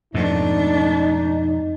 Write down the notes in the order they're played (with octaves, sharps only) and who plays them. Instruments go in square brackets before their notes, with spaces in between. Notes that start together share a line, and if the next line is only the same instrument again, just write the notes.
[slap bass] F2 G#2 B2 [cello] A3 D4 [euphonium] D#4